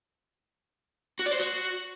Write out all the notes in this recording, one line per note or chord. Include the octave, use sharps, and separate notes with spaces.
F#4
D5
C5
F#4